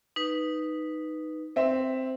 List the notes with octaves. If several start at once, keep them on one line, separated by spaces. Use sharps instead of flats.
D#4 B4
C4 E5